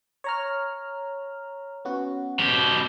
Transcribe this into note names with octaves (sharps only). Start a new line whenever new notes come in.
C#5 A#5 F6
B3 C#4 F#4
B2 G4